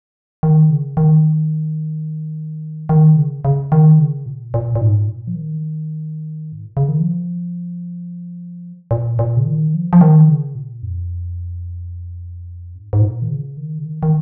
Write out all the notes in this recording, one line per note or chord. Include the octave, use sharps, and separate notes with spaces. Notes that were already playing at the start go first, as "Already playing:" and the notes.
D#3
C#3
D#3
D#3
C#3
C#3
D#3
C#3
A#2
A#2
A#2
G#2
A#2
F3
D#3
G#2
A#2
C#3
D#3
F3
A#2
A#2
C#3
D#3
F3
F3
D#3
C#3
A#2
F2
G#2
G#2
A#2
D#3
C#3
D#3
C#3
D#3
D#3